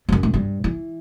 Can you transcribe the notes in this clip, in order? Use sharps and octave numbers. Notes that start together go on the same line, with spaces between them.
E2
F#2
A2
G2
E3